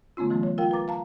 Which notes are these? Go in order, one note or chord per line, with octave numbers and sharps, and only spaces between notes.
D3 A3 B3 C#4 F4
E3 F#3 A3 A#3 C#4
C#5
F4 A#4 F5 G5
A#4 B4 A#5 D6 A6
F5 A5 A#5